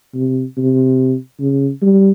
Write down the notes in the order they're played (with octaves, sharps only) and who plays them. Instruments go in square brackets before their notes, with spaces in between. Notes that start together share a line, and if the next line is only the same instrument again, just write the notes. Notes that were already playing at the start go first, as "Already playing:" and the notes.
[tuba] C3
C3
C#3
G3